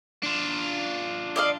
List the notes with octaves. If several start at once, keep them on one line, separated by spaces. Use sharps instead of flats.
D4 F4
D5 D#5 F5